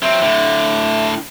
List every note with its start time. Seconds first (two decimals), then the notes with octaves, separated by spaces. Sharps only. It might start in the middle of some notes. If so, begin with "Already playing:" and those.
0.03 F#3 C4 E5
0.22 A2 D3